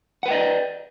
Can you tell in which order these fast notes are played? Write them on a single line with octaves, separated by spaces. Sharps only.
F#5 B4 G5 D#5 D5